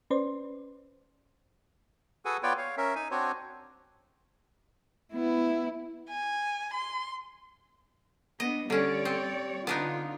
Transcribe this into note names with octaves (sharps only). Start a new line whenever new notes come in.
C#4 B4 C5 D5 C6
F#4 G#4 A4 B4 F#5 G#5
B3 F4 B4 C#5 D5 G5
C#5 F5
C#4 A#4 E5
D#4 G#5
C4 D4 F#4 C5 C#5
B3 E4
G#5
C6
B3 D4 D#5
D3 G3 C#4 C#5 D5
C4
D3 B3 D4 D#4 F4